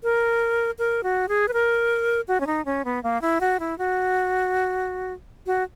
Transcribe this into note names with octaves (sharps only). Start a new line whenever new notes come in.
A#4
A#4
F#4
G#4
B4
A#4
F#4
C#4
D#4
C#4
B3
A#3
E4
F#4
E4
F#4
F#4